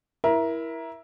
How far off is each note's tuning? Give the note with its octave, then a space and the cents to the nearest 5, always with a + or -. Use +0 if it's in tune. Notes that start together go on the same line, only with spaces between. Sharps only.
E4 +0 A#4 +20 A#5 +25